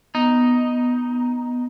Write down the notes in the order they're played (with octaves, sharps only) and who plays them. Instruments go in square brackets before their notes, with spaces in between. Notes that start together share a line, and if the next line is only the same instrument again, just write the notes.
[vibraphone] B3 [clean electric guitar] D#4